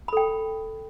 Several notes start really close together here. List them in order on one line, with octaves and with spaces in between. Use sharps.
B5 A4 G5